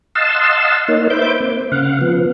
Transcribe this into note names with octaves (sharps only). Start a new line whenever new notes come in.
D#5 F5 F#5 A5 C6 E6
A#3 D#4 C#5
B4 C5 E5 D6 G6
A#3 C4
C#3 F5 F#5
F3 B3